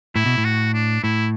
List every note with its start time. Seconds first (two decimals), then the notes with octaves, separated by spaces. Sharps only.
0.15 A2 E4
0.26 B2
0.38 A2
0.45 F#4
0.73 D4
1.03 A2 E4